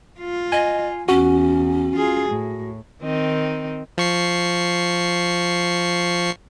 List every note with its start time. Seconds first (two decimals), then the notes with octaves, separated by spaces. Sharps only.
0.20 F4
0.52 D#5 G#5
1.09 E2 C#4 F#4
1.96 F4 G#4
2.29 A2
3.02 D#3 C4 D#4
3.98 F3 C#6 C7